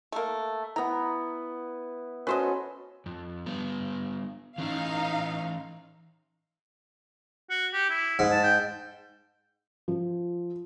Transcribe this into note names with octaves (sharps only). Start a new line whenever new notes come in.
A3 A#3
B3 E4 A#5
C#4 F#4 A4 B4 C5 D#5
F2
G3 B3
E3 C#4 D#4 E4 F5
F#4
G4
E4
G#2
A5
G5
F3